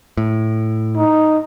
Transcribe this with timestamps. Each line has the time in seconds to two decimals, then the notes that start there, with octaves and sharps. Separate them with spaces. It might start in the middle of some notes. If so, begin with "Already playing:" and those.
0.17 A2
0.97 D#4